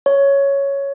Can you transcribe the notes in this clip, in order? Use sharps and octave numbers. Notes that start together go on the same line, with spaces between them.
C#5